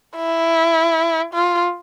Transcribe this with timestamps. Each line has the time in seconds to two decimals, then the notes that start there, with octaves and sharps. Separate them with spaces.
0.16 E4
1.34 F4